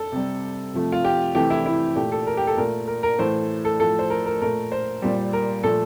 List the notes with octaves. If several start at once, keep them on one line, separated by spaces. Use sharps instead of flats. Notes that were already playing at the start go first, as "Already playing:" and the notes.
Already playing: A4
C3 G3
C3 F3 A3
F4
G4
C3 E3 A3 G4
E4
E4
A#2 A3 G4
A4
A#4
G4
A4
A#2 A3 A#4
A#4
A#4
A2 E3 A3 C5
A4
A2 F3 A3 A4
C5
A#4
A#4
A#2 A3 A#4
C5
A#2 G3
A#4
A#2 F3 A3 A4